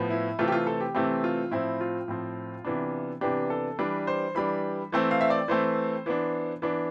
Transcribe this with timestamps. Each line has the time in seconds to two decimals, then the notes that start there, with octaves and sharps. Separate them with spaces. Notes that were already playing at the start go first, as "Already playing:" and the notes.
Already playing: A2 F3 B3
0.10 E4
0.39 C3 E3 A3 C4 F4
0.48 G4
0.52 F4
0.67 A4
0.81 G4
0.95 C3 E3 A3 C4 G4
1.24 F4
1.51 A2 F3 C4 E4
1.81 F4
2.08 A2 F3 C4
2.65 C3 E3 B3 D4
3.21 C3 E3 B3 D4 G4
3.50 A4
3.79 E3 G3 D4 B4
4.07 C5
4.35 E3 G3 D4 B5
4.92 E3 A3 C4
5.11 F5
5.21 E5
5.30 D5
5.48 E3 A3 C4 C5
6.06 E3 B3 D4
6.62 E3 B3 D4